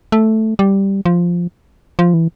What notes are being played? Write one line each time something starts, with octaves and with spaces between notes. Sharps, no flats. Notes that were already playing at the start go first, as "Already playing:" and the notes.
A3
G3
F3
F3
E3